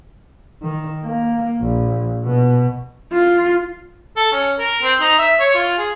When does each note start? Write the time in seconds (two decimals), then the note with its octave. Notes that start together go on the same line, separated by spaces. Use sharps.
0.62 D#3
1.04 A#3
1.61 A#1
2.24 B2
3.12 F4
4.16 A4
4.32 C#4
4.59 A#4
4.83 C4
5.01 D#4
5.19 E5
5.39 C#5
5.55 F4
5.78 G#4